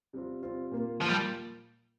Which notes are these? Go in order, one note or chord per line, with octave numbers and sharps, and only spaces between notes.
C3 G3 C4 F4
C3 G3 C4 F4
A#2 A#3 F4
A#2 F3 A#3 F4
G3